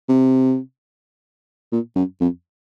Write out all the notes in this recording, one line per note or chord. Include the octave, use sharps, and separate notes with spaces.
C3
A#2
F#2
F2